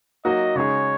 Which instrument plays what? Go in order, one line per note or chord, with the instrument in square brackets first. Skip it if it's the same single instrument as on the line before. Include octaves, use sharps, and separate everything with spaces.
[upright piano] F#3 A#3 D#4 F#4 [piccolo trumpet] D#5
[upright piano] C#3 G#3 D#4 G#4 [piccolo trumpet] C#5